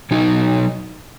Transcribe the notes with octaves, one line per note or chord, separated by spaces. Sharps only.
B2 F#3 D#4